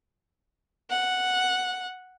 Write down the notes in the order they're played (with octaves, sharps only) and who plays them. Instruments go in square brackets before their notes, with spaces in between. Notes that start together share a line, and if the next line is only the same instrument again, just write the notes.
[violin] F#5